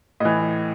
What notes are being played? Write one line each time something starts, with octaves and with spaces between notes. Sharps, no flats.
A2 E3 D#5